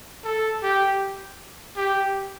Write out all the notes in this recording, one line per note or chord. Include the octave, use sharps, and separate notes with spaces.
A4
G4
G4